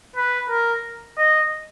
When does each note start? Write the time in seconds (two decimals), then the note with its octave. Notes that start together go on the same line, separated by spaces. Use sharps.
0.16 B4
0.49 A#4
1.17 D#5